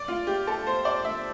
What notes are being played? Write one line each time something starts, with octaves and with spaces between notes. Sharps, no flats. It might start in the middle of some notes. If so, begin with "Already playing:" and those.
Already playing: D5
F4
G4
A4
C5
D5
E5